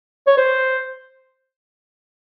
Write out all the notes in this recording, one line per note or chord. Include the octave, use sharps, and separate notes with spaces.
C#5
C5